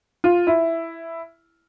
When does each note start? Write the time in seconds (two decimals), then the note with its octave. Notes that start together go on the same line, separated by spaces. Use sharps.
0.24 F4
0.47 E4